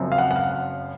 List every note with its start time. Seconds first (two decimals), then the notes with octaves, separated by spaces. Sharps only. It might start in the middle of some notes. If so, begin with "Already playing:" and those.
Already playing: F#1 F#2 F3 C4
0.12 F5
0.18 F#5
0.31 F#5
0.36 F5